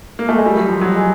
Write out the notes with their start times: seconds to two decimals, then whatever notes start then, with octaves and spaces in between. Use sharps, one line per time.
0.19 A#3
0.29 A3
0.38 G#3
0.46 G3
0.56 F#3
0.69 F3
0.81 F#3
0.95 G#3